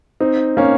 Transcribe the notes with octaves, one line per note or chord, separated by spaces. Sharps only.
C4 D#4
A#3 C#4